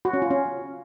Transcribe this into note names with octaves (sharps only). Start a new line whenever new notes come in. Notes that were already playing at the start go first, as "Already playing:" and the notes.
F#4
C#4
F4
C#4